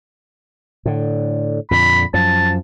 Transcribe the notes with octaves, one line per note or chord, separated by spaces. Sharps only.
A2 D3
F2 A#2 D3 B5
F#2 F3 A5